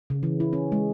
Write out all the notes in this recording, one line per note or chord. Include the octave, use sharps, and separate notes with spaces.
C#3
E3
E4
C#4
G#3